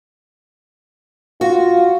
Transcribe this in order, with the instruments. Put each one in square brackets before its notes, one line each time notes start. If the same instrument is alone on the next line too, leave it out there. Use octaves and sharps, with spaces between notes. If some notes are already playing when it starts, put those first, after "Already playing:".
[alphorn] F4 [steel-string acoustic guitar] F#4